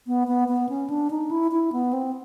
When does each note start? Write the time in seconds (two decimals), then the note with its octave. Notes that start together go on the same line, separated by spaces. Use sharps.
0.07 B3
0.28 B3
0.48 B3
0.69 C#4
0.90 D4
1.11 D#4
1.31 E4
1.52 E4
1.72 B3
1.93 C4